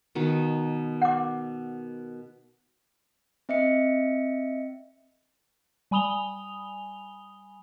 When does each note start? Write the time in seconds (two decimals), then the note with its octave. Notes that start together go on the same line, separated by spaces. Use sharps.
0.15 B2 D#3
1.02 F#5 D6
3.49 C4 D#5 E5 C#7
5.91 G3 G#5 B5 D#6 F7 G7